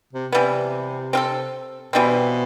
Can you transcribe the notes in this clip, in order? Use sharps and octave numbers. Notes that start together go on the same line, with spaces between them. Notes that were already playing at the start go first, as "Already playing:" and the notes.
C3
C3 E3 G3 B3
C4 F4 A4
B2 E3 G3 C4